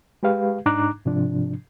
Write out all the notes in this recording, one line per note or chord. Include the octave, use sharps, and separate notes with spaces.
G#3 G4 B4 F5
G#2 D4 D#4 A#5 D6 F#6
G#2 C3 F3 D4